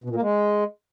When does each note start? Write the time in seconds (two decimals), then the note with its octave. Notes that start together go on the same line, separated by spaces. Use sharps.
0.04 B2
0.10 A#2
0.16 A#3
0.22 G#3